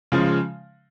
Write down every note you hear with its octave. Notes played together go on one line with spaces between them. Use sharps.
C#3 F3 G#3